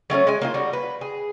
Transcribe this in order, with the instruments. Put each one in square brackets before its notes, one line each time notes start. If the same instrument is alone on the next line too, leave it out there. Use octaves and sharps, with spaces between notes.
[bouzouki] F#3 A3 C4 C#4
G#3 G#5
A#3 D#4 F4
G3 F#4
B4
G#4